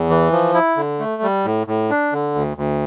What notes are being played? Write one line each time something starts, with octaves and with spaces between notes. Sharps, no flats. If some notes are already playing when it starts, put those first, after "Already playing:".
Already playing: E2
E3
F3
E4
D3
A3
G3
A2
A2
D4
D3
D2
D2